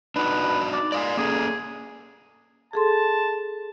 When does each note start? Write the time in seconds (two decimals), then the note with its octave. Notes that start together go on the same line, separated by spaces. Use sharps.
0.16 D4 D#4 F#4 B4
0.73 D5
0.92 G#3 D5 F5 G#5
1.17 A#3 C#4 G#4 A4
2.73 G#4 A4 A5 C6